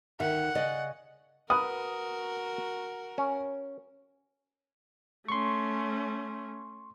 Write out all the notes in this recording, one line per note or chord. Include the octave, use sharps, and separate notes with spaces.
D2 D#3 E5 F#5
C#3 D5 D#5
F#4 A#4 B4 F#5 D#6
C#4
A3 C#4 C6 C#6